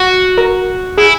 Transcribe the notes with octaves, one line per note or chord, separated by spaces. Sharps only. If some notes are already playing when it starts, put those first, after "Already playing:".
Already playing: F#4
A#4
E4 G#4